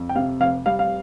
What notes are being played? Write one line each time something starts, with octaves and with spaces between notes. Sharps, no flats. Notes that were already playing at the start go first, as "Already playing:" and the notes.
Already playing: F2
G5
C3 F5
F1 F5
G3 F5
F5